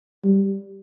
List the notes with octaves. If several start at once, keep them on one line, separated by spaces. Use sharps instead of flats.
G3